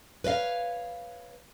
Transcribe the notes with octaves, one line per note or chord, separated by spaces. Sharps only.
B4 C#5 D#5 F5